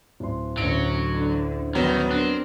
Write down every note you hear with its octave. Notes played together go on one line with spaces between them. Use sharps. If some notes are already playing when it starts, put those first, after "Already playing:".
D1 C6
A1 D2 F#3 C#4 D7
D3
F#2 D#3 F#3 G3 B3
C4 D4 A#4 F#6